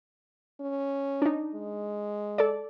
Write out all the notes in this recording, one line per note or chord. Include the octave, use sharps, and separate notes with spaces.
C#4
D4 D#4
G#3
A4 D5